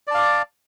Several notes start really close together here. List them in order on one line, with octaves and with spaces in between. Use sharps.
D5 A5 F5 D6